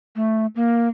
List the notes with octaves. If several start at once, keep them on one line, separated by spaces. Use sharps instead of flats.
A3
A#3